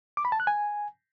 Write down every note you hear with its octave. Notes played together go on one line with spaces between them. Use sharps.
D6
B5
A5
F#6
G#5